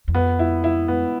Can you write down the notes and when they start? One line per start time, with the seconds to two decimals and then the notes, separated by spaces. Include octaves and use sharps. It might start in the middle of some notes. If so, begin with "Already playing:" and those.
0.08 E2
0.14 F2 B3
0.39 E4
0.64 E4
0.88 B3